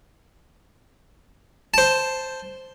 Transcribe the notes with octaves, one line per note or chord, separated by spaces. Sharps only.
C5 A5